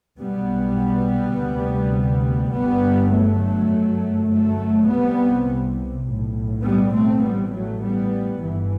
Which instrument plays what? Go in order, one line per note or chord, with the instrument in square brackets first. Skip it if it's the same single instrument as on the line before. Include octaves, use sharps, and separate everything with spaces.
[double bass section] B1 B2 G3 B3
D2 C3
G1 G2 G3 B3
F#3 A3
G1 F#2
F#3 A3
C2 C3 G3 B3
B1 A2
G3 B3
A3 C4
A1 A2 G3 B3
F#3 A3
G3 B3
G1 G2 E3